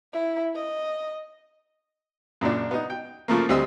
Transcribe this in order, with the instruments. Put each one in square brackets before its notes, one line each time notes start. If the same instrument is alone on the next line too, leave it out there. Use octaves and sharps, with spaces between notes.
[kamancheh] E4
D#5
[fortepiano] F#2 A#2 C#3 D4
B3 D#4
G5
C#3 F3 A3 A#3
D2 G3 C4 D#5 D#6 E6